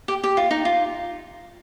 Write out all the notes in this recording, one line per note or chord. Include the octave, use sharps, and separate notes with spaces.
G4
G4
F4
D#4
F4